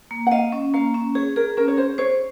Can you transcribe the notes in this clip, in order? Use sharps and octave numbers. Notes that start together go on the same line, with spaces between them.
A#3
F#5
D#5 F5
C#4
A#3 F5
C#4
G#4 C#5
G#4 A#4
C#4 A#4
C#5
G#4 C5
C5 C#5